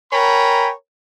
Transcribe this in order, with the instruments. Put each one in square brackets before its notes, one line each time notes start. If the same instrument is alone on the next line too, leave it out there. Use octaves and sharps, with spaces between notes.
[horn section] A#4 C#5 G5 G#5 A#5 B5